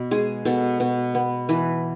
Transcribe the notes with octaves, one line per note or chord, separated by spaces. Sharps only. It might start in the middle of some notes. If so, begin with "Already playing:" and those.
Already playing: B2
G#3 G#4
B2 A4
B2
B3
E3 B4